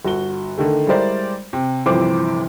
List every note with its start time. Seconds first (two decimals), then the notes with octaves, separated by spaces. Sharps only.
0.05 G1 F#4 G7
0.58 D3 D#3 A3
0.87 G3 G#3 E4 A#4 C5 D5
1.53 C3
1.86 G1 C3 E3 F3 C5 D6